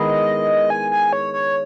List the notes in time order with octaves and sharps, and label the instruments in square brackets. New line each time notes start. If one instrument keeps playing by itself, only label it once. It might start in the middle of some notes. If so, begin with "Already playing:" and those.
Already playing: [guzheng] D#3 G#3 B3 E4 A#4 [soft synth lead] D#5
[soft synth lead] G#5
G#5
C#5
C#5